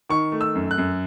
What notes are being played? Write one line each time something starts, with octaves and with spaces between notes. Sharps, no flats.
D#3 C#6
A3
E6
F#2
F#6
F#2